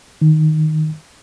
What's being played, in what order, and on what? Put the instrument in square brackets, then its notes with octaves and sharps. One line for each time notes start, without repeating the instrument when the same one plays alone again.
[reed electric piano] D#3